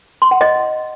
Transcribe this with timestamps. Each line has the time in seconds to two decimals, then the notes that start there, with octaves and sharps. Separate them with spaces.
0.22 C6
0.31 F#5
0.41 D#5